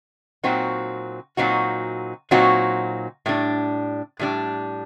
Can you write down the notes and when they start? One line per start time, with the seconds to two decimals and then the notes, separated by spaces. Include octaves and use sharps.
0.43 A#2 F#3 C4 D#4 F#4
1.37 A#2 F#3 C4 D#4 F#4
2.31 A#2 F#3 C4 D#4 F#4
3.26 A2 G3 D4
4.19 A2 G3 D4